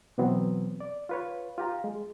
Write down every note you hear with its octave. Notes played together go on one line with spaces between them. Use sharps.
B2 E3 F#3 B3 C4
D5
F4 B4 C#5
F4 G4 A#5
G#3